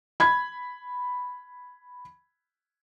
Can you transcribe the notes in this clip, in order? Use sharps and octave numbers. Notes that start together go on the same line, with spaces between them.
B5 G#6